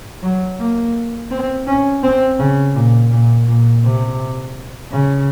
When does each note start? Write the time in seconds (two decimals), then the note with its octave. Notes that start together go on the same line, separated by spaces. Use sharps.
0.23 F#3
0.59 A#3
1.31 C4
1.67 C#4
2.03 C4
2.39 C#3
2.75 A#2
3.12 A#2
3.48 A#2
3.84 C3
4.92 C#3